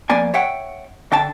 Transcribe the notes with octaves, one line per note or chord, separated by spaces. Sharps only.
F2 A#3 B3 D5 G#5
C#5 E5 F#5 G5
D3 G5 A5